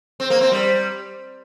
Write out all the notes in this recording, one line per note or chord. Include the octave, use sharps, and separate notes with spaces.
C4
A#3
C4
G3